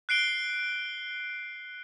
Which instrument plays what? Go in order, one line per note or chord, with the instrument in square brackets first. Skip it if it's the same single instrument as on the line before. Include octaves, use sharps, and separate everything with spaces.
[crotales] F#6 C7 D7 G7